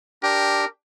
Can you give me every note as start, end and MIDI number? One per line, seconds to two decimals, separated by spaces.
0.23 0.65 62
0.23 0.65 67
0.23 0.66 70
0.23 0.65 79